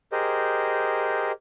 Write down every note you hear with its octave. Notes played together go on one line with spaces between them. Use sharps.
G4 G#4 A#4 C5 D#5